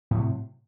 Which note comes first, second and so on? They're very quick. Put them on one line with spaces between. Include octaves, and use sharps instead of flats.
A2 F#3 C3